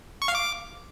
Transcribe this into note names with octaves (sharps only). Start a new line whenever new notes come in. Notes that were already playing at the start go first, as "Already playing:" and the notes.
C#6
F5
D6